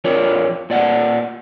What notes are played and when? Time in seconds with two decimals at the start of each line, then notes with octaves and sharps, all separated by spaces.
0.04 F2 F4 A#4 C#5 D5
0.70 A#2 D5 F#5